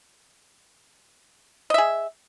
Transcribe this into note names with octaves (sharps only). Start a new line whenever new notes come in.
G#4 D#5 E5